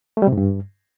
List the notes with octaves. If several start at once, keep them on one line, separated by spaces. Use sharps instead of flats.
A3
G3
C3
G#2
G2